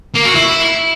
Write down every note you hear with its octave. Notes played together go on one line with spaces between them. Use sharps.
A#3
F#4
E4